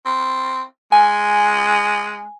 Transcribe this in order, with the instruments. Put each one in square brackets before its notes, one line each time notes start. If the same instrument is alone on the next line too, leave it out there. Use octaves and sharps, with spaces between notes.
[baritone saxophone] C4
[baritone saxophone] G#3 [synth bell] G#5